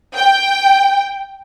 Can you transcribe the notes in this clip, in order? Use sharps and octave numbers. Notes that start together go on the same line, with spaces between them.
G5